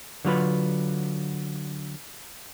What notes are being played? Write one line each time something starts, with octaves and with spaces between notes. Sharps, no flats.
D3 F#3 F4 B4